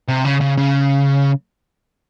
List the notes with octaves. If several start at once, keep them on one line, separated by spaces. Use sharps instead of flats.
C3
C#3
C#3
C#3